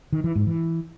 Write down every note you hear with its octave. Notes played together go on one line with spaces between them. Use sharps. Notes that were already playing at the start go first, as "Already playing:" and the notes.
D#3
E3
G#2
E3